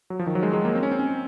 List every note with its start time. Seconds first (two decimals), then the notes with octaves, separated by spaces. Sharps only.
0.10 F#3
0.19 F3
0.27 D#3
0.35 F#3
0.43 G#3
0.53 G#3
0.65 A#3
0.75 C4
0.83 C#4
0.92 C4
1.00 C#4